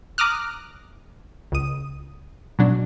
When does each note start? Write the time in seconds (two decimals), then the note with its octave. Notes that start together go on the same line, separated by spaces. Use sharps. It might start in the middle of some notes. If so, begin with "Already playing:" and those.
0.18 A#5 D6 D#6 F6 F#6
1.52 C#2 D#6
2.59 B2 F#3 D4